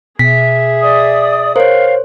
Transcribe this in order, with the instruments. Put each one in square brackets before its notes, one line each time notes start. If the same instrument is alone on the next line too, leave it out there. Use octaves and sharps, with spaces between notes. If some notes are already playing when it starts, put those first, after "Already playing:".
[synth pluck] B2 [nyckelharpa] G#4 E5 [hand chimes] B6
[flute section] D5 D#6
[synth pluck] A#4 [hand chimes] C5 C#5 [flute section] F5